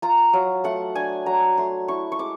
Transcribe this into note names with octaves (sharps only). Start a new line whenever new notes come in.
F4 A#5
F#3 F5
A3 F#5
D4 G#5
F#3 A#5
A3 C6
E4 C#6
C#6
G#3 D6